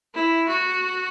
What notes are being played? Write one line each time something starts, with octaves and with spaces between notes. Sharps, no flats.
E4
F#4